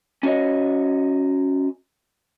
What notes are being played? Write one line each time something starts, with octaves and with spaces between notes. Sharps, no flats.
C#4 F#4 C#5 D#5